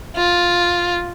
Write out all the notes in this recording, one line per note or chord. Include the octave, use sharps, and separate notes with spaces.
F4